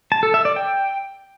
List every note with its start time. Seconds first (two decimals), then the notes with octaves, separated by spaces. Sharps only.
0.12 A5
0.23 A4
0.34 E5
0.45 D5
0.56 G5